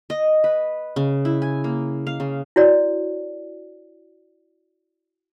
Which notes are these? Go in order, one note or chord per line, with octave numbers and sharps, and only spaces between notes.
D#5
B4
C#3
E4
G#5
A#3
F5
C#3
E4 F#4 C#5 D5